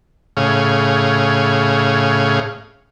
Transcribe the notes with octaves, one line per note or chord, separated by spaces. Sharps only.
A2 C#3 G#4 C#5 F5